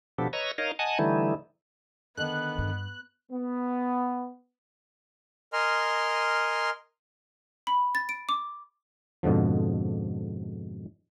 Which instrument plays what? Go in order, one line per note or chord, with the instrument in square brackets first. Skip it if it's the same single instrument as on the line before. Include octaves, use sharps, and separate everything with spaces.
[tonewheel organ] B2 F3 B3 D4 G4 A4
B4 C#5 D#5 A#5 C#6 E6
D#4 A#4 C#5 D#5 F5
D#5 F#5 G#5 A5
D3 E3 G3 A3 D#4 E4
[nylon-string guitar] D3 D#3 [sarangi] B3 [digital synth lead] F#6
[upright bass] G2
[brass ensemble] B3
[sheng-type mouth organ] A#4 D#5 G#5 C6 F6
[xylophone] B5
A6
D7
D6
[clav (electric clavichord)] F2 G#2 B2 D3 F3